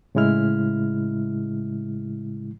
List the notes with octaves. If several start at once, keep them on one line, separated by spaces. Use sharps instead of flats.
A2 C#3 G#3 E4 F6